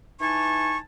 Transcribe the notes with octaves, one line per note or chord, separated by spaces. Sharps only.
E3 D#4 G#5 A5 C#6